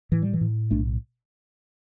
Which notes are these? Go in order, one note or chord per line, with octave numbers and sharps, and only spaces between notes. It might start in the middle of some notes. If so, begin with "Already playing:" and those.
A2 E3
G3
E3
A2
B1 A3 D4